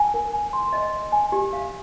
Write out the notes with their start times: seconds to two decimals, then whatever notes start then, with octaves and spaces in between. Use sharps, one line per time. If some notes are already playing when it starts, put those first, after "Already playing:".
Already playing: G#5
0.14 A#4
0.33 G#5
0.53 C6
0.73 D#5
0.93 D#5
1.12 G#5
1.32 G4
1.53 F5